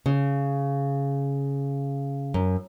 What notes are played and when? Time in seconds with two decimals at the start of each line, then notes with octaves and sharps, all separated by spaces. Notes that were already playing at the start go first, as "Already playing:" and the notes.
0.06 C#3
2.34 F#2